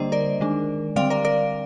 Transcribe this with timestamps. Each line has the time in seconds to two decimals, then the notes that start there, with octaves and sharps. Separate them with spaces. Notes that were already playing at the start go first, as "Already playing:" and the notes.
Already playing: D3 G3 A#3 D4 C5 D#5
0.12 A#4 D5
0.41 D#3 G#3 D4
0.96 D3 G3 C4 D5 F5
1.10 A#4 D5
1.25 A#4 D5